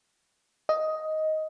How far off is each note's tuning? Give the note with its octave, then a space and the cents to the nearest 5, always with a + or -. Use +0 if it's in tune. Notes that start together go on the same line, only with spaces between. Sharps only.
D#5 +10